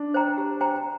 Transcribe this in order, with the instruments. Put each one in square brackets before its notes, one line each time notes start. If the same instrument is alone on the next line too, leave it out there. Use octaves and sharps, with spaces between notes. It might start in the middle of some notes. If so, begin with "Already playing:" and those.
Already playing: [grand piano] D4
[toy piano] C5 G5 A#5
G4
C5 G5 A#5